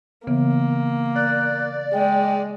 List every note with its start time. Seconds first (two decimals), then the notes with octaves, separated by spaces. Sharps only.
0.27 C#3 E3 A#3 B3
1.16 D5 F#6
1.93 G#3 G5